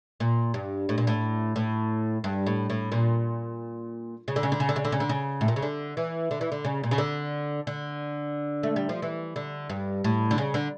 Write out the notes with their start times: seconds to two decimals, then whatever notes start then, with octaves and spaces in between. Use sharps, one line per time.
0.20 A#2
0.54 G2
0.89 A2
0.98 A#2
1.07 A2
1.56 A2
2.24 G2
2.47 A2
2.70 A2
2.92 A#2
4.28 C#3
4.36 D3
4.43 C#3
4.52 D3
4.60 C#3
4.69 D3
4.76 C#3
4.85 D3
4.92 C#3
5.00 D3
5.09 C#3
5.41 A2
5.48 A#2
5.56 C#3
5.62 D3
5.97 E3
6.31 D3
6.41 E3
6.52 D3
6.65 C#3
6.84 A#2
6.91 C#3
6.98 D3
7.67 D3
8.63 A3
8.76 G3
8.89 F3
9.02 E3
9.36 D3
9.70 G2
10.04 A2
10.31 D3
10.38 C#3
10.54 D3